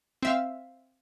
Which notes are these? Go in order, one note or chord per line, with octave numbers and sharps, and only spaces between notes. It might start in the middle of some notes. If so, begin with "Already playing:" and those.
C4 E5 F5